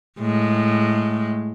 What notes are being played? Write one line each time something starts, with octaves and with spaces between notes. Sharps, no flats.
A2 G#3